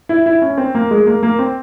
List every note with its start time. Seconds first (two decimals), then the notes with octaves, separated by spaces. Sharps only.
0.09 E4
0.26 E4
0.42 C#4
0.58 C4
0.75 A#3
0.91 G#3
1.07 A#3
1.23 A#3
1.39 C4